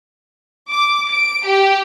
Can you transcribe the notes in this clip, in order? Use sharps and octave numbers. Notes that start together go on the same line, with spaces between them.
D6
D7
G4